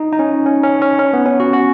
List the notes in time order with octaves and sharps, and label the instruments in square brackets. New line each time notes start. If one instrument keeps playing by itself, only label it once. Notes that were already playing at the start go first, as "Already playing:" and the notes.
Already playing: [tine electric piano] D#4
D#4
C#4
C#4
C#4
C#4
C#4
B3
C#4
F#4
F#4